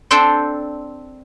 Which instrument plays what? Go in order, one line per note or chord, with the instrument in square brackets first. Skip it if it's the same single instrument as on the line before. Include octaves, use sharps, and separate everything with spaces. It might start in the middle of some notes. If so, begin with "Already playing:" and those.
[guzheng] C4 D4 A4 C5 G5 A5